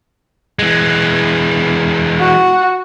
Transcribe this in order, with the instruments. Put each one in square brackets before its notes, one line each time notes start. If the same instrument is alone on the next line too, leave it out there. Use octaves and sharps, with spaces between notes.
[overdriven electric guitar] E3 G#3
[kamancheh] F#4